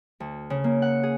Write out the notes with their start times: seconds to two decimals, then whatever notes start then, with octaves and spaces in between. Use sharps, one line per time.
0.20 D2
0.50 C#3
0.64 A#3
0.82 F#5
1.03 G#4